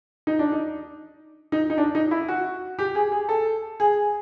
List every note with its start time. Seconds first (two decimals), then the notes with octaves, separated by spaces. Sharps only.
0.27 D#4
0.39 D4
0.52 D#4
1.52 D#4
1.70 D#4
1.78 D4
1.95 D#4
2.11 E4
2.28 F#4
2.79 G4
2.95 G#4
3.12 G#4
3.29 A4
3.80 G#4